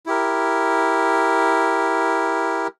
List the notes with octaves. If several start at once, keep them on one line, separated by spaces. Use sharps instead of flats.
E4 G4 A#4